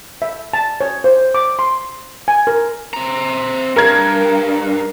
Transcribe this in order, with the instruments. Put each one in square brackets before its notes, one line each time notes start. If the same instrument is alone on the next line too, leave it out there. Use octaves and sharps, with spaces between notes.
[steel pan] E5
A5
C#5
C5
D6
C6
G#5
A#4
[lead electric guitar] C4 A#5
[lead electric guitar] G2 [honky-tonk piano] A#4 G#6